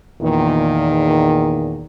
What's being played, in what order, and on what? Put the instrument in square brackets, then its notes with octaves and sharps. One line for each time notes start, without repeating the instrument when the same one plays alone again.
[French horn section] E2 A#2 D#3